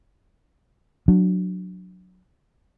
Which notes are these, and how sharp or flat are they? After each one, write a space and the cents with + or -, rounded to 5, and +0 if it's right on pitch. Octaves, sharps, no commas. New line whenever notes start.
F#3 -10 D4 +0